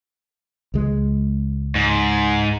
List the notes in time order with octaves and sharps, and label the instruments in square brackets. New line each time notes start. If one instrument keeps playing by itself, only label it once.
[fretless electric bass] C#2 G#3
[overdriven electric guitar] G#2